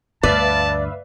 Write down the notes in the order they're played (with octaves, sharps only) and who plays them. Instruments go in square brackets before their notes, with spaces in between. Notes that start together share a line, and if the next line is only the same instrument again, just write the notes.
[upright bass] D2 G2 [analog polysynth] B4 E5 F5 [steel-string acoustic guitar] D5 [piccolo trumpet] A5